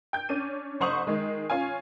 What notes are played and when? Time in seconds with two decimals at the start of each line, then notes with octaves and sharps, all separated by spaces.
0.13 G5 G6
0.29 C#4 D4 D#7
0.80 F#1 C5 F#5 C#6 D#6 F#7
1.07 D#3 G#3
1.50 C#4 F4 G#5